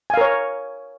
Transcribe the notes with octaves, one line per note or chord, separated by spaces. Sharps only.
A#4 C#5 F5 G#5